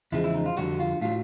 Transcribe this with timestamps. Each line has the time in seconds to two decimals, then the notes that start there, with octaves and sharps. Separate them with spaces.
0.12 E2 C#3 F3 G#3 E4
0.24 E4
0.34 D#4
0.46 F4
0.57 F2 D3 G3 F#4
0.80 F4
1.02 A2 F#3 F4